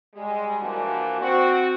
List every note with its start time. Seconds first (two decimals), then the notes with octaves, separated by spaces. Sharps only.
0.15 G3 G#3
0.61 E3 F3 A#3 D4 F#4
1.21 C4 F#4